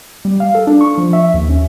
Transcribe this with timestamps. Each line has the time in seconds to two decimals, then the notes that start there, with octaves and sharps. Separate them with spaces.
0.25 G3
0.40 F5
0.55 A4
0.67 D4
0.81 C#6
0.98 F3
1.13 E5
1.34 D#2
1.49 C#4